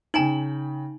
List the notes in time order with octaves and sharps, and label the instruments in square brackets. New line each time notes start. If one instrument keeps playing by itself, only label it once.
[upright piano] C#3 G5 F#7 [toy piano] D#4 G#5 A#5